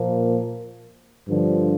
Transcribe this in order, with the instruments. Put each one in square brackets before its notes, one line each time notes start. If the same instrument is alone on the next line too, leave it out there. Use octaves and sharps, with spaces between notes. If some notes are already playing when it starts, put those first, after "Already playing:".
Already playing: [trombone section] A#2 F3 A#3
G2 D3 F3